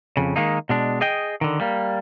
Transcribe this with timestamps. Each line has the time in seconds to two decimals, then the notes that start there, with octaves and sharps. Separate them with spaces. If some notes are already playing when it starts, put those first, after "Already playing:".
0.17 F2 C#3
0.36 D#3 G#3 A#3 D#4
0.69 B2 G#3 D4
1.01 G#4 D#5 G5
1.41 D3 D#3
1.61 G3 A#3